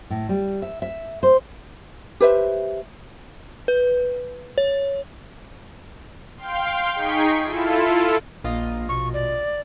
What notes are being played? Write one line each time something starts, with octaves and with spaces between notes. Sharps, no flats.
A2
G3
E5
E5
C5
G4 B4 C5 E5
B4
C#5
F5 G5 C6
D#4 G#4 G5 C#6 B6 C7
E4 F4 A4
A#1 A#3 F4 D#5
B2 C#6
D5